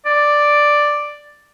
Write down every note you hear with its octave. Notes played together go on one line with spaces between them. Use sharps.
D5